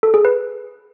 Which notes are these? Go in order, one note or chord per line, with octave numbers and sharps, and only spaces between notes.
A4
G#4
B4